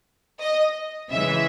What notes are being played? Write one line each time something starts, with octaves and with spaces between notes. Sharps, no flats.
D#5
C#3 E3 G#3 E5